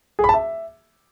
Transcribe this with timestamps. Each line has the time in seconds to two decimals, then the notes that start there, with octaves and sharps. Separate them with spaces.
0.19 G#4
0.24 B5
0.29 A5
0.34 E5